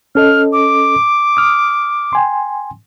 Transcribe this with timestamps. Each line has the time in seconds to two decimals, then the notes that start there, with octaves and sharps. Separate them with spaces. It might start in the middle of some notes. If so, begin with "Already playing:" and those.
0.15 C#4 A4 D#5 F6
0.53 D6
1.37 D#6 F6
2.13 G5 G#5 C6